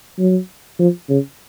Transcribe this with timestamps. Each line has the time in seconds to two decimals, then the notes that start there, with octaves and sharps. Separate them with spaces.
0.19 F#3
0.79 F3
1.09 C#3